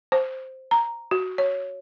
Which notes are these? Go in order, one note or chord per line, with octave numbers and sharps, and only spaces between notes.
C5
A#5
F#4
C#5